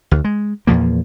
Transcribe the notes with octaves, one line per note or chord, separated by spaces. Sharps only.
D2
G#3
E2 A#2 F3 A#3